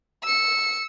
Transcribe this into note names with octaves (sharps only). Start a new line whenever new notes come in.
E6 C#7